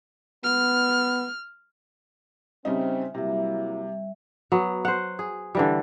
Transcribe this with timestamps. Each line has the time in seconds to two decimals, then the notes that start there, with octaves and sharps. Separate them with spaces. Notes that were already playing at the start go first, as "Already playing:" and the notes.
0.44 B3 F6
2.65 C#3 G3 C4 D#4 E5
3.15 C3 F#3 G3 A#3 E4 E5
4.52 F#3 B3
4.85 C5 F#5
5.19 G#4
5.55 D3 E3 G3